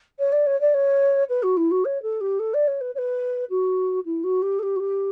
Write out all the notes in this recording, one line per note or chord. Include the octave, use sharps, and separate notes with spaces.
C#5
D5
C#5
D5
C#5
B4
F#4
E4
F#4
C#5
A4
G4
A4
D5
C#5
B4
C#5
B4
F#4
E4
F#4
G4
A4
G4
F#4
G4